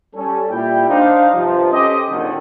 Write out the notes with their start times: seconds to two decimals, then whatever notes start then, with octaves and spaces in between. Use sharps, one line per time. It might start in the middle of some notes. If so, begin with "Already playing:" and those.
0.15 G3 C#4 A4
0.50 A#2 G3 E4 G5
0.89 D4 D#4 C5 F5
1.33 G2 C3 F3
1.71 C#4 G4 A4 C5 D#5
2.09 G#1 D#2 A#2 D3 D#3